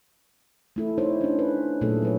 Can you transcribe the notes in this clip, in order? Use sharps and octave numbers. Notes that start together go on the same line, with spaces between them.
A3 E4 A4
D#4 E4 C5 C#5
C#4 D4
B4
A#2 F#3 A3 G#4 A4
F#3 B4 C#5